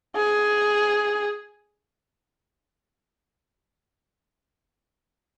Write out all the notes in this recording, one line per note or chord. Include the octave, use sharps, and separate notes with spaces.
G#4